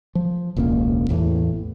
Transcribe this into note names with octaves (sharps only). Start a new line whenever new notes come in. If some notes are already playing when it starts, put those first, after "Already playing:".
F3
E1 C#2 C#3 A#3
A1 E2 A2 E3